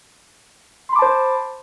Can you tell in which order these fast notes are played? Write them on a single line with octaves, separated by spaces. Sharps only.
C6 B5 D6 A5 C5